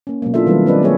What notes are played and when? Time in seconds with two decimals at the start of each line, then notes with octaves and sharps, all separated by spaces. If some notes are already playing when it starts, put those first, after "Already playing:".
0.07 A#3 C#4
0.22 B2 F#3 G#3 A#3
0.34 D4 E4 F4 A4 E5
0.46 D#3 F#3 G3 A3 C#4 B4
0.66 C4 D4 B4 D5 D#5
0.82 F#3 A#3 D4 G#4 C#5 E5